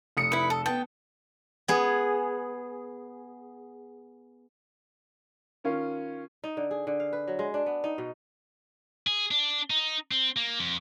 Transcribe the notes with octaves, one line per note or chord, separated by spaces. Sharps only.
F1 D#6 C#7
E4 B4
A4
B3 G5 A5
B3 G#4
D#3 C#4 F4
D#4
D3
G#4
D3
F5
B4
F#3
G#3
D4
B3
D#4
B2
G#4
D4
D#4
C4
A#3
F2